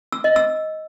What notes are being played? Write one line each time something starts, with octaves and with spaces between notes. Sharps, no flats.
E6
D#5
E6